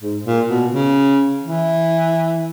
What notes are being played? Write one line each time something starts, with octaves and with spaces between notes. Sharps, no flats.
G#2
A#2
B2
C#3
E3